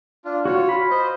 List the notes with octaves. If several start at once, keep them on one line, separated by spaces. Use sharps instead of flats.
D4 F4
F4 F#4 C#5
B5
C5 D#5